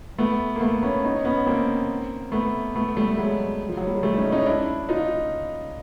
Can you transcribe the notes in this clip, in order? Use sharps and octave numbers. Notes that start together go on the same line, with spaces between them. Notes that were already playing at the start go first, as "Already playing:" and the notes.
A3 B3
A#3
A3 B3
B3 C#4
C#4 D#4
B3 C#4
A#3 C4
A3 B3
A3 B3
G3 A3
F#3 G#3
F3
F#3
G3
G#3
G3 A3
C#4 D#4
C#4 D#4
D4 E4
D#4 F4